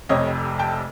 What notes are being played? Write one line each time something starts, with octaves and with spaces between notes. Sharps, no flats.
F1 F2 C3 C#5 D#5
G5 A5